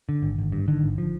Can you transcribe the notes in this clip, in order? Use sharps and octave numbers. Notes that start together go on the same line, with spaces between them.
D3
G#1
G#1
G2
D3 D#3
G#1
F3